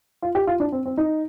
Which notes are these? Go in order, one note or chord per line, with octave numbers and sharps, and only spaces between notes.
F4
G4
F4
D4
C4
C4
D#4